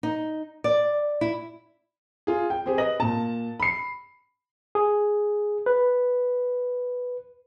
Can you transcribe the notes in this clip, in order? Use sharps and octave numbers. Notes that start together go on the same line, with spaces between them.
D#4
D5
E4
F4 G#4
G5
C4 G4 G#4
B4 D#5 A#6 F#7
A#2 A5
B5 C7
G#4
B4